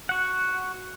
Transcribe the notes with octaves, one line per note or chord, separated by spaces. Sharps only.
F#4 F#5